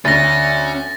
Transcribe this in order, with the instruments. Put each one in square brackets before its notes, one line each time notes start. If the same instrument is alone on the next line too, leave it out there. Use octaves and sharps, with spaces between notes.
[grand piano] D2 [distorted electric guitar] C#4 [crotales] A6 A#6